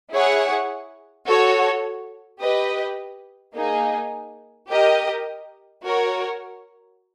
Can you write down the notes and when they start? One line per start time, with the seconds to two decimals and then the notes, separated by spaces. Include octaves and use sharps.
0.11 E4 G#4 C#5 F#5
1.26 F#4 A4 C#5
2.40 G4 B4 D#5
3.54 A#3 D#4 G#4
4.69 G4 A#4 D#5
5.83 F#4 A#4 C#5